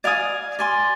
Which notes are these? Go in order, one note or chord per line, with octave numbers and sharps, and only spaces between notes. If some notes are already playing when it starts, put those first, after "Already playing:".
D5 F5 G#5 D#6
D5 G#5 C6